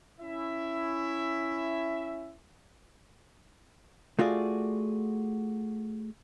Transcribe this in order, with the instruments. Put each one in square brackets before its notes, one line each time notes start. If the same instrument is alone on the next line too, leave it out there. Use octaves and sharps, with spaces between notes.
[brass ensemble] C#4 E4 E5
[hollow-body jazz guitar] A3 F4 F#4 G#4 D5